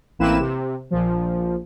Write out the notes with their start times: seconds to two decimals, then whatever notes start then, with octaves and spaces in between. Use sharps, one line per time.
0.19 A1 A#3 C4 E4 B4 E7
0.40 C3
0.91 A#1 A#2 F3